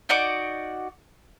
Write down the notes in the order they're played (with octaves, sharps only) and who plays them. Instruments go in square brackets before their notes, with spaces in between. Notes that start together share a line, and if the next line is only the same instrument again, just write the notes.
[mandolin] D#4 F#4 D5 D6